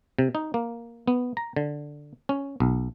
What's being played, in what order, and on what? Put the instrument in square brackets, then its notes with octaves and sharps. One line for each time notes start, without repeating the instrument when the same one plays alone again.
[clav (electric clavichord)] C3
D#4
A#3
B3
A#5
D3
C#4
B1